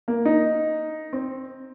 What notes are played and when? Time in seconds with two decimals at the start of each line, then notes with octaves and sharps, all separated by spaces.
0.08 A#3
0.25 D#4
1.13 C4